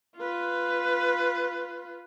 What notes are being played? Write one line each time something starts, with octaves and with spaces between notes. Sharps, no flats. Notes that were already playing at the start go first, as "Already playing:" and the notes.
F4 B4